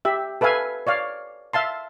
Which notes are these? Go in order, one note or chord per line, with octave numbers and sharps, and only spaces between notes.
G4 E5
A4 B4 E5 F5 G#5
C#5 D5 F5
E5 F5 A5 C6